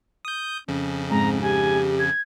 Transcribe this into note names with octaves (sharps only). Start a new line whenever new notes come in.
D#6 G6
F2 C#3 C#4
G#2 C4 A#5
G4 G#5
G#6